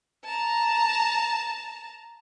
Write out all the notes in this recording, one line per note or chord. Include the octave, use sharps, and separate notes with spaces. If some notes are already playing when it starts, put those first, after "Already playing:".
A5 A#5